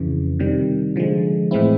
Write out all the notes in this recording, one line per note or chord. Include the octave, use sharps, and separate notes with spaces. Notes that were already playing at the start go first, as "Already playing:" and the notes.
Already playing: F2 C#3 E3
C3 D#3 G3
D3 F3 G#3
A2 E3 G#3 C4 E4